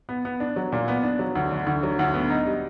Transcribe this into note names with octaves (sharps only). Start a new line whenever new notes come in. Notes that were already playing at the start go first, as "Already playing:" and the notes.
B3
B3
D4
F#3
A#2
B3
D4
F#3
D2
D3
D2
F#3
D2
B3
D#4
G3